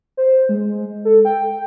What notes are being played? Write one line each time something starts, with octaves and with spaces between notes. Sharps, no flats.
C5
G#3
A4
G5